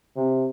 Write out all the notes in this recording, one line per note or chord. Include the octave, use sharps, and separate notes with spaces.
C3